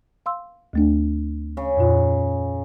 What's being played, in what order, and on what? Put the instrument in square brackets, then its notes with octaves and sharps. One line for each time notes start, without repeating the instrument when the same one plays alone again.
[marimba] F5 C6 E6
D2 A3 D4
[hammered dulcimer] C#3
[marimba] F2 A#2 F4